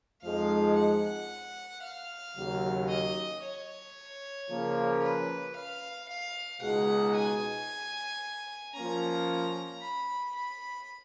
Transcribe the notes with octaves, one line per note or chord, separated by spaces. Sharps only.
F2 F3 G#3 D#4 F5
F#5
F5
D#2 C#3 F#3
D#5
C#5
C#3 F3 A#3 C#4
B4
F5
F5
C#2 B2 G#3 D#4 G#4 F#5
G#5
F3 A#3 C#4 A#5
B5
B5